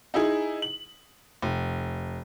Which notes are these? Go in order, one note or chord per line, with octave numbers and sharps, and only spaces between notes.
D#4 E4 G#4
F#7
F1